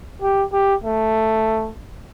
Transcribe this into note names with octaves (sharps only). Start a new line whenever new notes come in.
G4
G4
A3